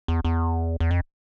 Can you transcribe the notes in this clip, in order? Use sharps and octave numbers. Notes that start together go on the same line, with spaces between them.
E2
E2
E2
F2